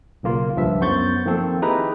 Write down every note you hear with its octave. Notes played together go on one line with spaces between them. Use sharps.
B1 C#3 A#3 F4 A#4
C#2 G2 F3 E5
F#2 B3 C5 C#6 G6 A6
D#3 F3 A#3 C4 A4
D#4 E4 G4 G#4 B4 A#5